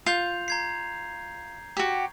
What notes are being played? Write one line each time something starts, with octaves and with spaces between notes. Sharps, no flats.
F4 G6 F7
A#5 G#6 C7
F#4 G4